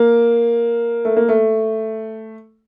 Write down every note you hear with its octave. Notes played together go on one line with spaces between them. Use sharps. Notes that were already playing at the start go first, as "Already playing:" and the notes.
Already playing: A#3
A3
A#3
A3